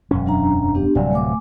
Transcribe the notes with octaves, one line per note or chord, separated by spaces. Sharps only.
E1 F#2 C#4
F#3 D4 A#5
B3 D4 G4
D1 C3 F#3 G3 D5 G#5
A3 G#5 D6